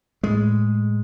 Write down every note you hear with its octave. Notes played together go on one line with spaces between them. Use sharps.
A2 G#3